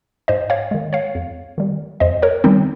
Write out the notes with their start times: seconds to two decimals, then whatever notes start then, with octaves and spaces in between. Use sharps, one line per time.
0.28 G#2 C5 D#5
0.50 C#5 F5
0.71 D#3 G#3
0.93 C#5 F5
1.15 F2
1.58 D#3 G3
2.00 F2 C5 D#5
2.22 A#4 C#5
2.44 D#3 G3 C4 D#4